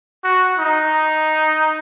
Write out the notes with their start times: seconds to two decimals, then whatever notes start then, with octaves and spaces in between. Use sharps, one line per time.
0.24 F#4
0.59 D#4